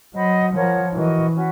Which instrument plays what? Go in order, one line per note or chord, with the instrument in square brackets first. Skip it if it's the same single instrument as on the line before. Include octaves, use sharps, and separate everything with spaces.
[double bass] F#3 [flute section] C5 D#5 F#5 B5
[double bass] F3 [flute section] A#4 C#5 F#5 A5
[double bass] E3 [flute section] F#4 A#4 D#5
[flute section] C#4 F#4 B4